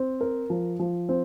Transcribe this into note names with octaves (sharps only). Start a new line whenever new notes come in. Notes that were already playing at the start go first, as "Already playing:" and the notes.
Already playing: C4
A#4
F3
F3
C4